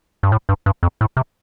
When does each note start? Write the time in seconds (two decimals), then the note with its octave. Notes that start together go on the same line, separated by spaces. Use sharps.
0.23 G2
0.32 A2
0.49 G2
0.66 G2
0.83 F2
1.01 A2
1.17 C3